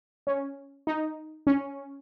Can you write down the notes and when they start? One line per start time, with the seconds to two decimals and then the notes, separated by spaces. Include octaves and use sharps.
0.27 C#4
0.87 D#4
1.47 C#4